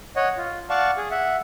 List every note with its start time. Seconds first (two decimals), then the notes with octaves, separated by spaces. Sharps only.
0.16 C#5 D#5 F#5
0.37 F4
0.70 D5 F5 F#5 A5 C#6
0.97 G#4
1.11 E5 F#5